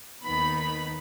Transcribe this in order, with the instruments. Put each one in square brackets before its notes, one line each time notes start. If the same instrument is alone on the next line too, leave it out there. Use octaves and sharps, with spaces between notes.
[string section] D#2 D#3 B3 D#4 B5